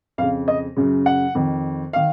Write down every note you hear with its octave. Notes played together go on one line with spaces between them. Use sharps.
F2 C#3 F5
D#5
F#2 C#3
F#5
F2 D#3
D#3 F5